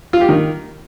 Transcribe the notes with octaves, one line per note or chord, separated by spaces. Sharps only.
F4
G4
D#3